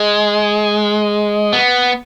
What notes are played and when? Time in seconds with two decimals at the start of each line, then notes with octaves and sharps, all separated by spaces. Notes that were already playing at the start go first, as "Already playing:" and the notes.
Already playing: G#3
1.53 B3